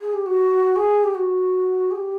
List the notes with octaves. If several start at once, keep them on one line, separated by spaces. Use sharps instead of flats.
G#4
G4
F#4
G#4
G4
F#4
G#4
G4